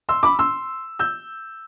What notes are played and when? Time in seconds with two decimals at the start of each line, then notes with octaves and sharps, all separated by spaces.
0.09 C6 E6
0.23 B5 D6
0.39 C6 E6
0.99 E6 G6